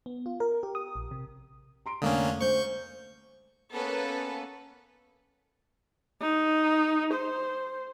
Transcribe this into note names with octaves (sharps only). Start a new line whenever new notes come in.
B3
F4
A#4
G4
D#6
A#1
C3
A#5 C6 D7
F1 D3 A#3 C#4 F5 D#6
D2 C5 C#6 G6
A#3 B3 C#4 A4 B4
D#4
C5